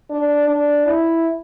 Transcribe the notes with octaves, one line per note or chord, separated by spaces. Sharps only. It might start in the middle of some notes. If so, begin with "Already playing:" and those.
D4
D4
E4